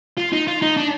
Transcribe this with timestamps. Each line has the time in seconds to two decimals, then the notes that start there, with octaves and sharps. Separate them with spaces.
0.17 F4
0.32 D#4
0.48 F4
0.62 D#4
0.77 D4